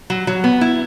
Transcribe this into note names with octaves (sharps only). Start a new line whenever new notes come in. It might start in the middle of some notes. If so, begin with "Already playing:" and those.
F#3
F#3
B3
E4